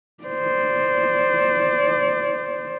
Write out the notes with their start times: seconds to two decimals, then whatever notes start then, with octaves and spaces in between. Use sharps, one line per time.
0.24 C5 D5